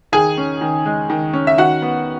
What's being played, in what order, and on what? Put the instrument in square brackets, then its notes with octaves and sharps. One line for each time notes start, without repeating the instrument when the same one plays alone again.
[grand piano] D#3 G#4 G#5
C#4
D#3
G#3
D#3
C#4
E5
D#3 F#4 F#5
B3